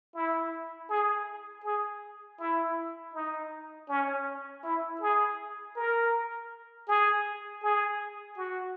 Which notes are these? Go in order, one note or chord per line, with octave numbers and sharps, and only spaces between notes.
E4
G#4
G#4
E4
D#4
C#4
E4
G#4
A#4
G#4
G#4
F#4